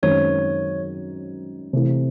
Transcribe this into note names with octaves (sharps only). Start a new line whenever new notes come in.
F#2 D#3 G#3 C4 D#4 C#5
C3 E3 A3